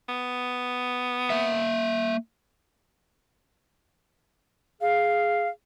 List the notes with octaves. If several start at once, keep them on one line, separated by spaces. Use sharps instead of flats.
B3
A#3 E5
G#4 F5